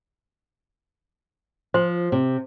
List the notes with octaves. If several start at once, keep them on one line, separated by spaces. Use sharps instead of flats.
F3 C5 C6
C3